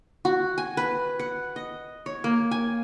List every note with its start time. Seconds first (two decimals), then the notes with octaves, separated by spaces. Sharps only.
0.25 F#4
0.58 G#5
0.77 B4
1.20 F#5
1.56 D#5
2.06 C#5
2.24 A#3
2.51 G#5